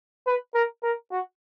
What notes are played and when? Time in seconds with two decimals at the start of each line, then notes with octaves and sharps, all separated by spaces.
0.27 B4
0.55 A#4
0.83 A#4
1.12 F#4